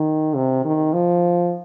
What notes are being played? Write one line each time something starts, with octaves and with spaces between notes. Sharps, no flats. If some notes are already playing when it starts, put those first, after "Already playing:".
Already playing: D#3
C3
D#3
F3